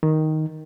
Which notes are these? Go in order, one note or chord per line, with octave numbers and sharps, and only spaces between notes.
D#3